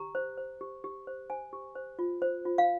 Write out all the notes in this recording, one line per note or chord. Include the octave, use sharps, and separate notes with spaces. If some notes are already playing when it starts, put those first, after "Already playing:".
Already playing: G4 A#5
C5
C5
G4
G4
C5
C5 G#5
G4
C5
F4
C5
F4
F5